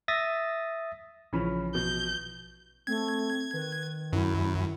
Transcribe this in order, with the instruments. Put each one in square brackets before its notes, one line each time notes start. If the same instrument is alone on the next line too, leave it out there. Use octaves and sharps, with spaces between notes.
[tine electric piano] E5 D#6 A6 A#6
[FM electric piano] A#1 E3 F3 [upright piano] C#3 C#4 B5
[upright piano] B2 [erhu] G6
[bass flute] A3 [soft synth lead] C4 [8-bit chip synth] G#6
[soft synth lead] D#3 [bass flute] B4
[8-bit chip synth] F#2 [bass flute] E4